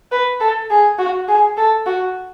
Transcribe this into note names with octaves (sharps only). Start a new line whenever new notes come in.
B4
A4
G#4
F#4
G#4
A4
F#4